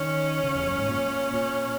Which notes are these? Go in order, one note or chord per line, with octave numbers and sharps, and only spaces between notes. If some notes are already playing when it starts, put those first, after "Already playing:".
Already playing: D#3 C#4
C#3
E2
F#2
G#2
A#2
A#2